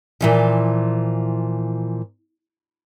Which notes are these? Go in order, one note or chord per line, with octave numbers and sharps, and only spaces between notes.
A#2 E3 F3